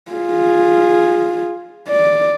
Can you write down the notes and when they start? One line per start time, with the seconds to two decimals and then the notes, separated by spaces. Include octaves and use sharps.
0.12 F4 G#4
1.89 D5